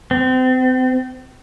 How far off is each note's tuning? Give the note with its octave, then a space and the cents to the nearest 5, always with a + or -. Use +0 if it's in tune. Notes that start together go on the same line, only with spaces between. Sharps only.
C4 -35